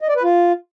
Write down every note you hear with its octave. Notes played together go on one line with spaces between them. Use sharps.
D#5
D5
B4
F4